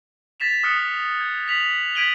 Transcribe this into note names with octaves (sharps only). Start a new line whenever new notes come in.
A6 B6 E7 F7
D#6 F6 F#6 C#7 E7
G#6
B6 F7 F#7
G#6 B6 D7 D#7 F#7 G7